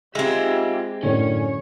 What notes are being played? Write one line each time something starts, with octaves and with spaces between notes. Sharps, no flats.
G#3 C4 F4 G4 E5
F#2 A2 D3 C#4 C#5